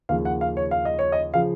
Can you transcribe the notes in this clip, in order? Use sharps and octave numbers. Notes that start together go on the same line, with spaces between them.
D#2 C#3 F3 F5
F#5
F5
C#5
F5
D#5
C#5
D#5
C#3 F3 F5